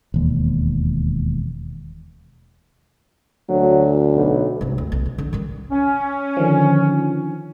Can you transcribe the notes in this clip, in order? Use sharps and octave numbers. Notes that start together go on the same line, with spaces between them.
E1 D#2
D2 F#3
B1
C2 G#2
D2
B1
C#4
D3
D#3 G3
C#4
D3 D#3 F3